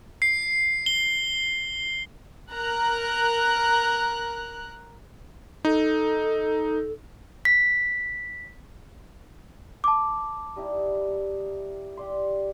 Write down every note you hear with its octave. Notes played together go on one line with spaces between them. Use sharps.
C7
G7
A#4 A#5 F#6
D#4 A4
B6
A5 D6
G3 D#4 E4
G4 D5 C6